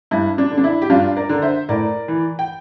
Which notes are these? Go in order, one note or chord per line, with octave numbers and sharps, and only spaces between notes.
G2 E4
D4
D3
D4
E4
G4
G2 D4 F4
A#4 D5
D3
C5 E5
A2 A#4 D5
E3
G5